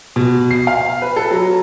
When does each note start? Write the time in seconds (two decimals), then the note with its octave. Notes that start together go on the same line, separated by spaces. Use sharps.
0.16 B2
0.51 C7
0.67 F5
1.02 B4
1.16 A4
1.31 F#3